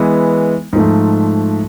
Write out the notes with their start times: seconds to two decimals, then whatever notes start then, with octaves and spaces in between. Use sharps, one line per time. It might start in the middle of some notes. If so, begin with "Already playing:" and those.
Already playing: E3 G#3 B3
0.73 G#2 F3 A3